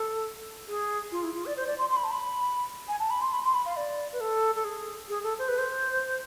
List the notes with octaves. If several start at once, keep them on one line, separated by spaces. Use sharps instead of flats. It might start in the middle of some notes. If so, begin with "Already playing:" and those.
Already playing: A4
G#4
F4
E4
F4
D5
C5
D5
C6
C6
B5
A5
B5
G#5
A5
B5
C6
B5
C6
B5
F5
D5
B4
A4
A4
G#4
G#4
A4
C5
B4
C5